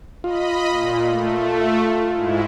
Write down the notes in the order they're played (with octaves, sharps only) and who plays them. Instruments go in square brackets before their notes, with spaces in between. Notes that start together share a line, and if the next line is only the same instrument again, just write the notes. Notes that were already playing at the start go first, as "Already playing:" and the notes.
[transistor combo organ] F4 [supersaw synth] D#5 B5
[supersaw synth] A#2
A3
G#2 G#3 E4